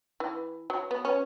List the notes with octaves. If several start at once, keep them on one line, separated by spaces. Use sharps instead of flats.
E3
F#3
B3
C#4